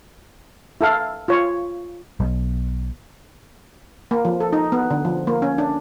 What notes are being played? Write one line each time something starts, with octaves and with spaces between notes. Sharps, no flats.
E4 A4 F5
F4 C#5
B1
A#3
F3
A4
D#4
B3
D3
F3
A#3
C#4
D4